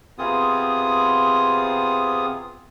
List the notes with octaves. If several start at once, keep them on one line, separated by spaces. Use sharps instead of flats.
C3 B3 C4 F4 G#4 D#6